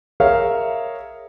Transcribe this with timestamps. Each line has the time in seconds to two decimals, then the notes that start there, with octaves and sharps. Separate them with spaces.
0.20 G#4 A#4 C#5 E5 F5